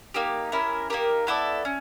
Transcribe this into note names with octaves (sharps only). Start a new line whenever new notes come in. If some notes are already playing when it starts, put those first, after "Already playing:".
A#3 D#4 G4
C#4 E4 G4 A#4
A#3 D#4 G4 A#4
B3 E4 A4 D5
C#4